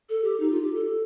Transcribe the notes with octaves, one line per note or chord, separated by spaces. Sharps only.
A4
G4
D#4
F4
G4
A4